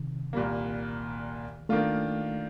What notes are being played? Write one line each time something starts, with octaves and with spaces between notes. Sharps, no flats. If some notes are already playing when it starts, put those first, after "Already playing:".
Already playing: C3 D#3
C2 A#2 G3 A#3
D#3 A3 A#3 D4 F4